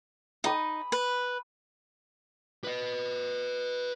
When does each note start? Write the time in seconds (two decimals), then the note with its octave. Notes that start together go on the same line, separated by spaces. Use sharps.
0.44 D#4 G#5 B5 D#6
0.92 B4
2.64 B4 D#5